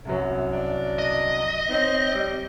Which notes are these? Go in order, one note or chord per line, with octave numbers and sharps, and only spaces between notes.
C2 F#2 F#3
D4
D#5
C4 D#4 C#5
G3